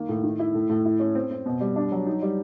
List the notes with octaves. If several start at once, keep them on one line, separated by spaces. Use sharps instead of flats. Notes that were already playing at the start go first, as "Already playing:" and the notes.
Already playing: D#3 A#3
A2
D#3
E4
A2
A2
E4
C#4
C4
C4
B2
G3
D4
F#3
D#4
G3